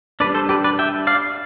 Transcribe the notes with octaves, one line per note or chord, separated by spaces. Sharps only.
G3 D4 B4 D5
A4 C5
G4 B4
B4 D5
E5 G5
D5 F5